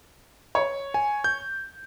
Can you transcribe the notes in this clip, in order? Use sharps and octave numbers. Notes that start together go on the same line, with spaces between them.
C#5
G#5
G6